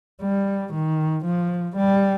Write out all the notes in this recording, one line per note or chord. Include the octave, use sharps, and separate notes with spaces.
G3
D#3
F3
G3